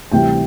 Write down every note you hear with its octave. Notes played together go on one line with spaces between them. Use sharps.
D2 C3 E3 G3 G5